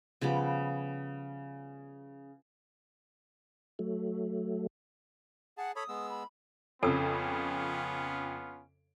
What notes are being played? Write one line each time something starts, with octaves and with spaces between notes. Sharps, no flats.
C#3 F3 G3 B3
F#3 A3
G#4 F#5 A5
A4 C#5 B5 D#6
G#3 B3 E6
B5
F2 C#3 B3 C#4 F4 A4 E6